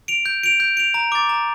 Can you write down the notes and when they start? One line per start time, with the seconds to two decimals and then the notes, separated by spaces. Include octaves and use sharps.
0.08 D7 F7
0.26 G6
0.44 D7 F7
0.60 G6
0.77 D7 F7
0.94 A#5
1.12 D6 A6
1.29 A#5